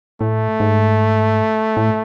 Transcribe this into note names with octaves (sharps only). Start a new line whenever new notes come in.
A2 A3
G#2
A2